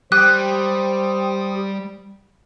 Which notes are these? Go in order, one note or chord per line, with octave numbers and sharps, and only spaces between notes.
G3 G4 C5 D#6 F#6